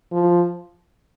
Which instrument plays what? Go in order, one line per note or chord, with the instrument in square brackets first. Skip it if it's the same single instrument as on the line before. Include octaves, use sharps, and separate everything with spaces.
[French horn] F3